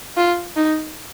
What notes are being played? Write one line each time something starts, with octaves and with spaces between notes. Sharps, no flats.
F4
D#4